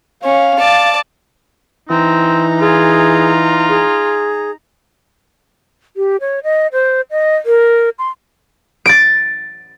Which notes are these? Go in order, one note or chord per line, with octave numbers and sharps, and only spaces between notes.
C#4 F5
D5 A5
E3 C4 D#4 A#5
F4 G#4
G#4
G4
C#5
D#5
C5
D#5
A#4
C6
A6 D7